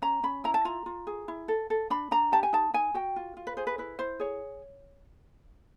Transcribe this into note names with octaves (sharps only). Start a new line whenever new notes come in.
C#4 A#5
C#4 B5
E4 A#5
A5
F4 A#5
F4
G#4
E4
A4
A4
D4 B5
D4 A#5
G4 A5
G#5
D#4 A5
D#4 G#5
F#4 G5
F4
F4
B4
G#4 C5
B4
E4 B4
E4 C5
G#4 C#5